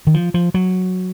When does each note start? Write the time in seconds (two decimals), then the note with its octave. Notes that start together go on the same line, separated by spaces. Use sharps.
0.07 D#3
0.14 F3
0.34 F3
0.54 F#3